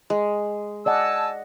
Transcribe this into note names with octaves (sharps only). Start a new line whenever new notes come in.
G#3
D5 D#5 F#5 G#5 A5 E6